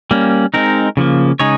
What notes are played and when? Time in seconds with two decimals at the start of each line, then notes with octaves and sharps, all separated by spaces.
0.11 G3 A#3 C#4
0.54 G#3 C4 D#4 A#4
0.97 C#3 F3 A#3
1.39 C#3 G#3 D#4 G#4 C#5